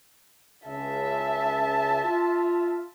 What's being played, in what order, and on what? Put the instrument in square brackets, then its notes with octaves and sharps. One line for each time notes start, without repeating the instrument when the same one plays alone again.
[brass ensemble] C#2 C#3 [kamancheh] E5 A5
[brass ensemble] F4